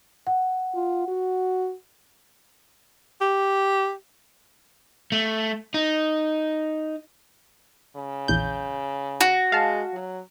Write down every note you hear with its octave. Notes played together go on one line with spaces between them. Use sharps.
F#5
F4
F#4
G4
A3
D#4
C#3
A#1 E2 G6
F#4
G#3 F5 A5
F#3